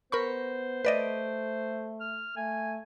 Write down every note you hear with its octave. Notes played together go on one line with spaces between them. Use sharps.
B3 A#4 C5 B5 C#6
A3 B4 D5 D#5
F6
A3 G#5